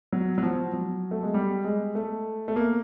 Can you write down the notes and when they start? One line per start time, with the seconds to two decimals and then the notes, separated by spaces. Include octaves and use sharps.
0.12 F#3
0.38 F#3
0.43 F3
0.73 F#3
1.11 A3
1.23 G#3
1.34 G3
1.64 G#3
1.95 A3
2.48 A3
2.56 A#3